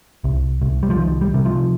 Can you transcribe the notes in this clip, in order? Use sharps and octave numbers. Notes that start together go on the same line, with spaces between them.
C2
C2
G3
F3
C2 D#3
G3
C3
F3